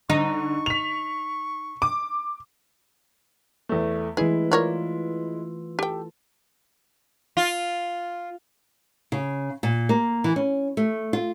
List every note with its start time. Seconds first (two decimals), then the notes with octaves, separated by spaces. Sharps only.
0.10 D3 D#4 C#6
0.66 B6 F7
1.82 D6
3.69 E2 A3
4.17 E3 G#3 A3 E4 G#4 B4
4.52 F4 A#4 C#5 D5
5.79 G4 A4 G5
7.37 F4
9.12 C#3
9.63 A#2
9.89 A#3
10.24 E3
10.36 C#4
10.77 A3
11.13 F4